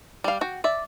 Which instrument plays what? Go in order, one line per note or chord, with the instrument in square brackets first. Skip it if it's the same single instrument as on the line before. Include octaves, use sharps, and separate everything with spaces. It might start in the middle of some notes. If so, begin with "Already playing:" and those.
[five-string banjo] G3 F5
F#4 G5
D5 E5